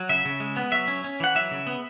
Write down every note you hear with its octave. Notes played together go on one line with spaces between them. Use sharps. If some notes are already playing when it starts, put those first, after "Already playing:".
Already playing: F#3
C#3 E5
C#3
G#3
B3
F#3 E5
C#4
C#4
E3 F#5
F#3 E5
C#3
B3